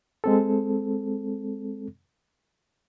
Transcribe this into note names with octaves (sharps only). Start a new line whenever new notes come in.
G#3 C4 A4